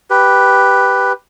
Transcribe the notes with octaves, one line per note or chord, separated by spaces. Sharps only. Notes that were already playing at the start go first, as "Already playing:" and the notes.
G4 B4